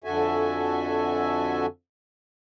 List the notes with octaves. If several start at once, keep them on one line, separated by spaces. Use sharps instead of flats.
F2 D3 F#4 A4 E5 G#5